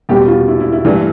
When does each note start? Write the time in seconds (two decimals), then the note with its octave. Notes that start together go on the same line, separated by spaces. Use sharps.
0.09 E2 B2 G3 G4
0.28 F4
0.48 E4
0.60 E4
0.72 E4
0.85 G2 E3 A3 D4